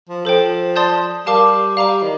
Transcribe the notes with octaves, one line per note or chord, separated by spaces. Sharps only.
F3
F3 A4 C5 G5
D5 A5 C6 D#6 G6
G3 G4 A#4 F5 A5 D6
G3 F5 A#5 D6
D#3